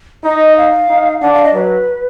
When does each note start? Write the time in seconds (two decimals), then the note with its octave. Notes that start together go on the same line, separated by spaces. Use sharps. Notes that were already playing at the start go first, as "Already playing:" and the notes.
0.24 D#4 D#5
0.57 F5
0.89 D#4
1.21 D4 F#5
1.33 F5
1.44 D#5
1.54 F#3 B4